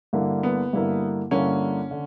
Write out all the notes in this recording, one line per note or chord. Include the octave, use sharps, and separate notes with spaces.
G2 D3 A#3 E4 A#4
B3
G2 D3 A#3 E4 A#4
G2 D3 A#3 C#4 E4 A#4
D3